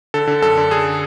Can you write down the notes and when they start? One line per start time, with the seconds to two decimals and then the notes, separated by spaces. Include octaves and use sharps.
0.14 D3 A4
0.27 D3
0.42 F#2 A4
0.57 D3
0.71 D3 G#4